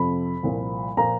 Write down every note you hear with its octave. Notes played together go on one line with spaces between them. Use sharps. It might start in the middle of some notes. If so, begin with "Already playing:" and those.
Already playing: F2 C3 F3 B5
C2 A#2 F3
A#2 F3 A#5